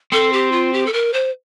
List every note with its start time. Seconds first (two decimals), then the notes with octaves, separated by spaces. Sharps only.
0.12 C4 A4
0.33 G4
0.52 F4
0.73 G4
0.86 A4
0.93 A#4
1.13 C5